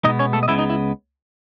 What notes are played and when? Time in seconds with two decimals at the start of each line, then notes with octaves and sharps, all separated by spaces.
0.04 B2 G#3 B3 D#4 D#5
0.19 C#4 C#5
0.33 A3 A4
0.43 D#5
0.48 C#2 C#3 G#3 B3 E4 E5
0.58 D#4 D#5
0.70 E4